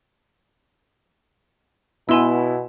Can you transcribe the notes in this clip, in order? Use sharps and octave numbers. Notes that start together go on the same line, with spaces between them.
B2 B3 E4 G#5 C6 E6 E7